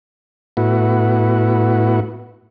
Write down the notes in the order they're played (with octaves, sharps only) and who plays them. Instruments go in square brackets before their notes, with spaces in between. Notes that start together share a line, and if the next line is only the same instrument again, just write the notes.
[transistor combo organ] A2 B3 E4 F#4